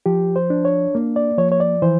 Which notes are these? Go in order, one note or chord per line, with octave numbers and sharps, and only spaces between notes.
F3 G4
C5
D4
C#5
A#3
D5
F3 C#5
C#5
D5
E3 C5